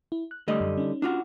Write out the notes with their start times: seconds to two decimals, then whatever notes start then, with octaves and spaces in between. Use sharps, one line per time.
0.12 E4
0.31 F#6
0.48 D3 G3 A3 D#5 D#6
0.61 F#2
0.77 C#4 D#4
1.02 D4 F4 F#4